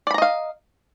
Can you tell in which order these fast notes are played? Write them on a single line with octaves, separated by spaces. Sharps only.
D5 B5 A#5 D#5 F5